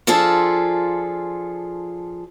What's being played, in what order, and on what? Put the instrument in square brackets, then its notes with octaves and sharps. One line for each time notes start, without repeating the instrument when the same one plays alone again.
[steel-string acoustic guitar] F3 D4 F4 G#4 A4